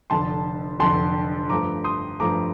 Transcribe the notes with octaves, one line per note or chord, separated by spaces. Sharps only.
F1 F2 D3 A5 C6
F1 F2 D3 A5 C6
G2 F3 A3 A#5 D6
C6 D#6
G2 F3 A3 A#5 D6